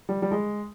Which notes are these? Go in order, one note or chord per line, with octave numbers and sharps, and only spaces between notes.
G3
G3
G#3